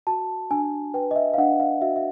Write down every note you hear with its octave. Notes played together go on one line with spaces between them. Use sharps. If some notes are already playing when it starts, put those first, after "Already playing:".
F#4 A5
D4 G#5
B4 G5
D#5
E5
F5
D4 F#5
F5
F#4 E5
E5